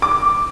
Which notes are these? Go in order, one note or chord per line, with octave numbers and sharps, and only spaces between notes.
D6